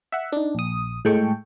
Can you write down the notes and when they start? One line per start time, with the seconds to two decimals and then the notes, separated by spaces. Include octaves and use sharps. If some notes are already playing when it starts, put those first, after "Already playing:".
0.12 E5 F#5
0.32 D4 D#4
0.55 A#1 D#6
1.05 A2 G#3 A4 G5 C#6